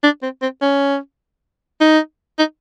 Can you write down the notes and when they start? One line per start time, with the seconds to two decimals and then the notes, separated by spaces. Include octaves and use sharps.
0.03 D4
0.22 C4
0.42 C4
0.62 C#4
1.81 D#4
2.39 D#4